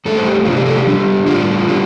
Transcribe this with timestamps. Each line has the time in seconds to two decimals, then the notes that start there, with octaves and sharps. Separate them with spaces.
0.05 G2 D3 A3 A4
0.16 C5
0.26 G4
0.45 C3 F3 D4 F4
0.56 G4
0.65 A4
0.76 G4
0.87 D3 G3 D4
1.26 A2 G3 D4 F4
1.68 D3 G3